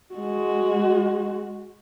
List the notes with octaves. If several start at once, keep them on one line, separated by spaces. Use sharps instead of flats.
G#3 F#4